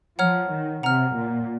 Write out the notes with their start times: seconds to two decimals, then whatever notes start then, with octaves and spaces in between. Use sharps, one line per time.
0.19 F3 C#5 F#5 A#5 F6
0.51 D#3
0.83 C3 F#5 A#5 F6
1.15 A#2